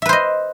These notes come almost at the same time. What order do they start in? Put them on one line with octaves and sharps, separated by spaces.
E5 B4 C5 D#5